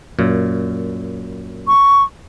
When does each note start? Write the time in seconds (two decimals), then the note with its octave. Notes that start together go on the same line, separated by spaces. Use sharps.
0.19 F#2 A#2
1.67 C#6